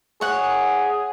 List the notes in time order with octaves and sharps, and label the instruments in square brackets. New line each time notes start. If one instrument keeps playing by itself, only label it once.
[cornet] G#4 [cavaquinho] C#5 F#5